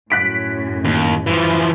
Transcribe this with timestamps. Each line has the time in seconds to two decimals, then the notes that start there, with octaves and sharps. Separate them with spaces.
0.10 F#2 A2 F#6 B6 D7
0.85 D#2
1.26 E3 F3